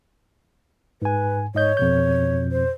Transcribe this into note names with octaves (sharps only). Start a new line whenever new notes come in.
G#2 B4 G#5
G#2 C#5 D#5 G6
F2 B2 G6
C5